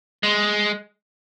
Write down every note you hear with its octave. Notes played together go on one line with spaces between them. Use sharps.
G#3